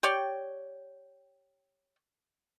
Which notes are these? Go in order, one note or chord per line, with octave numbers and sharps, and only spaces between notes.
G4 C#5 D5 G5